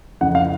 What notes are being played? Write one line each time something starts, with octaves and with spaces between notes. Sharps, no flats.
F2 C#3 E3 F#5
F5